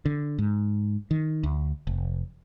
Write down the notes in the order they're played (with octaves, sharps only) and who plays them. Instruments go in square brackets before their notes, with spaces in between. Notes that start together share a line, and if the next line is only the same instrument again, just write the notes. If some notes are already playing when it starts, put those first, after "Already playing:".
[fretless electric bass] D3
G#2
D#3
D2
F1